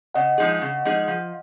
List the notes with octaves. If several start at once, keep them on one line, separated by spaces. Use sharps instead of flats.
C#3 D#5 F#5
F3 G#3 D#4 G#4
C#3
F3 G#3 D#4 G#4
F3